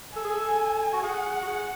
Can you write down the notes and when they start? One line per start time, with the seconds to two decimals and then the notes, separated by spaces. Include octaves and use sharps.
0.16 A4 G#5
0.24 G#4
0.34 A4
0.93 F#4
1.03 G#4 F#5
1.42 F#4
1.47 G#4